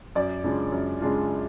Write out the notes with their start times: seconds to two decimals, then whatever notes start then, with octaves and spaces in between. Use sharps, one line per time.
0.15 F#2 D5
0.44 C#3 G#3 D4 F4
0.72 F#2
1.00 C#3 G#3 D4 F4